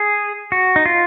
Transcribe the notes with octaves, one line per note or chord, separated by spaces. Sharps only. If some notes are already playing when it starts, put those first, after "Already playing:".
Already playing: G#4
F#4
D#4
F4